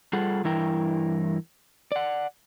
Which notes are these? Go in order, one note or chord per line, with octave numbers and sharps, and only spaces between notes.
G3 F4 G#4 A4 F#5
G2 E3 E4 A#4 G5
D5 F#5